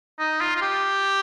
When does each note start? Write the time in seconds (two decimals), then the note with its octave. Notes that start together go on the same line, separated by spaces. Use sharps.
0.19 D#4
0.41 F4
0.56 F4
0.61 G4